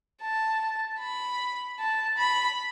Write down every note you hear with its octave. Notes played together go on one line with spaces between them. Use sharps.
A5
B5
A5
B5